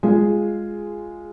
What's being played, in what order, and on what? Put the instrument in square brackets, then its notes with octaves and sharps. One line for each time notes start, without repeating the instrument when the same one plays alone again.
[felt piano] G#3 F4 G#4